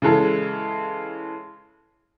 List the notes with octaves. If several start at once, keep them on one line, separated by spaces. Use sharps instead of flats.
C#3 E3 G#3 A4